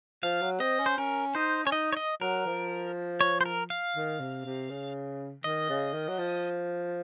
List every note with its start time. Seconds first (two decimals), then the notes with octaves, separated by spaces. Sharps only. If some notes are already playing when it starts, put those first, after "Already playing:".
0.23 F3 F5
0.41 F#3
0.60 C4 D#5
0.79 C#4
0.86 C5
0.98 C#4 A#4
1.35 D#4 C5
1.65 C#4 C#5
1.72 D#4 D#5
1.93 C#5
1.97 D#5
2.21 F#3 A#4
2.46 F3
3.21 C#5
3.41 C5
3.46 A#4
3.70 F5
3.95 D#3
4.20 C3
4.45 C3
4.70 C#3
5.44 D#3 D#5
5.69 C#3
5.94 D#3
6.08 F#3
6.19 F3